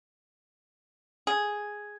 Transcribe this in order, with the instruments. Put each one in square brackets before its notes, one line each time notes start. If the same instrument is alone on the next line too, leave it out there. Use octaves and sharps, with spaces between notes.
[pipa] G#4